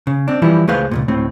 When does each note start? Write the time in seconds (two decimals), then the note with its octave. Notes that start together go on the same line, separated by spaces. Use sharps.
0.07 C#3
0.28 C4 D4
0.42 E3 F3 G3 E4
0.67 C#2 A3 G#4 B4 C5 F5
0.91 C#2 F#2 A#2
1.08 D2 A2 C4